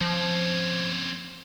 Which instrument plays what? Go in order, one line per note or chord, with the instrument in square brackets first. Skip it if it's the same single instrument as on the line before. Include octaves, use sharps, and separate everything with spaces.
[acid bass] F3 [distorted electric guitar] C4 C#4